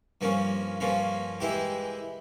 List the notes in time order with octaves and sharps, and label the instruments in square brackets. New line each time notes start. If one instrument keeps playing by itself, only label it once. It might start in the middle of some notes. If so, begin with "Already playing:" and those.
[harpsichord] G2 F3 A#3 C#4 F4
G2 F3 A#3 C#4 F4
E3 G#3 E4 G4